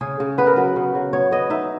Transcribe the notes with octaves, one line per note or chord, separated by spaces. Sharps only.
C#3 G#4
C#3
B3 B4
A#4
F#3 B4
C#3
F#3
B3 C#5
B3 D#5
D#4 E5